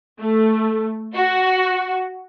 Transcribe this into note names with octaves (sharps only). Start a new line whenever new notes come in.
A3
F#4